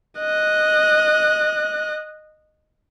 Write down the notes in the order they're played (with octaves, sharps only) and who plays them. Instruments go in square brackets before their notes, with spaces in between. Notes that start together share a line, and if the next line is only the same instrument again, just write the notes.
[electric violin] D#5 F#6